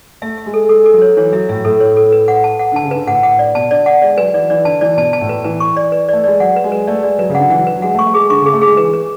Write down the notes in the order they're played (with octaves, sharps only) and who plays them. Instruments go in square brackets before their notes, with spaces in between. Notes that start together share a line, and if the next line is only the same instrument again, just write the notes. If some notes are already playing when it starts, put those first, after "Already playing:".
[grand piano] A3 [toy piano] E5
[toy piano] E5
[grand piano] G#3
[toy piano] A4
[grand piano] G#3 [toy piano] A4
[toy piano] A4
[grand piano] F#3
[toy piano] C#5
[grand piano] E3 [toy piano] C#5
[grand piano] F#3 [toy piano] E5
[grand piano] A2 [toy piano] E5
[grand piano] A2 [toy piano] A4
[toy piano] C#5
A4
B4
F#5
A5
F#5
[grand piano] D3 [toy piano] A5
[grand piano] C#3
[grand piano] D3 [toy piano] B4
[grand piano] A2 [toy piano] F#5
[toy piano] F#5
D5
[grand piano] B2 [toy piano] A5
[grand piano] D3 [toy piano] D5
[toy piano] F#5
[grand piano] G#3 [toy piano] D5
[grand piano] F#3 [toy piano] B4
[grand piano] E3 [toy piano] D5
[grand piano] E3 [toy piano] D5
[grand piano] D3 [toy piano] A5
[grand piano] E3 [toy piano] D5
[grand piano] B2 [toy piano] A5
[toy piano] A5
[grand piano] A2
[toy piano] B4
[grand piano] E3 [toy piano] B4
[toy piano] C#6
D5
B4
[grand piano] A3 [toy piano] D5
[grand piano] G#3 [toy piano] D5
[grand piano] F#3 [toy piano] F#5
[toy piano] B4
[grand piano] G#3
[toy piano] B4
[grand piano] A3 [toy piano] D5
[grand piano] G#3 [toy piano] D5
[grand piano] F#3 [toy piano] B4
[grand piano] C#3
[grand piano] D3 [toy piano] F#5
[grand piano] E3 [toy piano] F#5
[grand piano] F#3
[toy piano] B4
[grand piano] F#3
[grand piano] G#3 [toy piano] F#5
[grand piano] A3
[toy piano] C#6
[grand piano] A3
[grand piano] G#3 [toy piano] G#4
[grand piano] D3 [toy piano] C#6
[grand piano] C#3 [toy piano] G#4
[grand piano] A3
[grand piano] G#3 [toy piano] G#4
[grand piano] E3 [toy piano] B4
[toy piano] B4